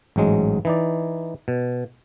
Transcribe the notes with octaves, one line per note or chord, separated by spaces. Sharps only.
A1 G#2 F#3 G#3
E3 D#4 D5
B2